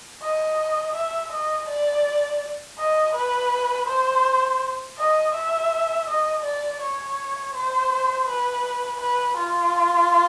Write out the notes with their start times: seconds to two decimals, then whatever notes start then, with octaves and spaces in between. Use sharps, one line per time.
0.22 D#5
0.95 E5
1.32 D#5
1.69 D5
2.78 D#5
3.15 B4
3.88 C5
4.98 D#5
5.35 E5
6.08 D#5
6.45 D5
6.82 C#5
7.55 C5
8.28 B4
9.01 B4
9.37 F4